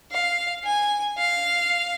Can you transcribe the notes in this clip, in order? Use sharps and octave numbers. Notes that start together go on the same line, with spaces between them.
F5
G#5
F5